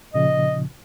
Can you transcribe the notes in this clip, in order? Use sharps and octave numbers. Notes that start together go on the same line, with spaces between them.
A#2 C#3 F3 D#5